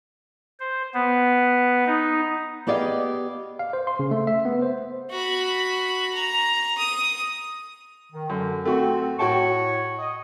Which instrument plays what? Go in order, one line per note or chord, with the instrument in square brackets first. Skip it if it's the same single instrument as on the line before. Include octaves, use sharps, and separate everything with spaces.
[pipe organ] C5
B3
D#4
[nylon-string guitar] B3 G4 G#4 D5 D#5 F5
[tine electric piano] F5
C5
C6
C#3
A3
E5
B3
C5
[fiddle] F#4 B5
A#5
D#6
[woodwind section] D#3
[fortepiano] F#2 [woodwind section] D3
[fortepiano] A3 F#4 [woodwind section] C4
[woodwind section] A2 C#5 C#6 [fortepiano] F#4 G5 A5
[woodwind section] D#5